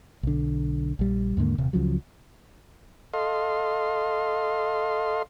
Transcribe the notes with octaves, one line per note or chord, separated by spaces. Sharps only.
B1 D3
A#1 G3
D#2 G#2 D3 A#3
D#1 C3
C#2 C#3 F3 F#3
A4 D#5 F5 C6